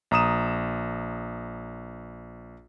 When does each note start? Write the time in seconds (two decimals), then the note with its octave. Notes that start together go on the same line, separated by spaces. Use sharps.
0.11 A#1 A#5 D#6 E7